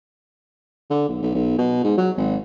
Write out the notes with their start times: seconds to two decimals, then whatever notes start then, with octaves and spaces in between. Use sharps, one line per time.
0.90 D3
1.09 B1
1.22 B1
1.35 B1
1.59 B2
1.84 G#2
1.98 F#3
2.17 G#1